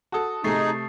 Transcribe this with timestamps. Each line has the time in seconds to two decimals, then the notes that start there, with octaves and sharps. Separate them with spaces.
0.12 F#4 A4 A5 D#6
0.44 C3 A3 D#4 G#4 C#6 A6 C7